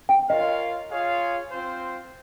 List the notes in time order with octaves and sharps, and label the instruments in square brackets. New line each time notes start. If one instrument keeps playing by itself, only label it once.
[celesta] G5
[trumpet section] F4 A#4 C#5 F5 [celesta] D#5
[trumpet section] F4 G#4 C#5 F5
C4 F4 C5